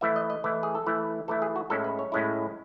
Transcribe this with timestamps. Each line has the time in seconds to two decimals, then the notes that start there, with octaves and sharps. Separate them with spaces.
0.01 E3 A3 E4 E5
0.16 D#5
0.30 D#5
0.44 E3 A3 E4
0.63 G#4
0.75 A4
0.86 E3 A3 E4 B4
1.28 E3 A3 E4 A4
1.42 G#4
1.56 F#4
1.70 A2 G#3 C#4 E4 A4
1.84 B4
1.99 C#5
2.12 A2 G#3 C#4 E4